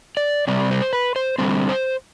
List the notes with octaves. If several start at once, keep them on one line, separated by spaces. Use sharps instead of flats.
D5
C3 G3 C4 D5
C5
B4
C5
D3 G3 C4 C5
C5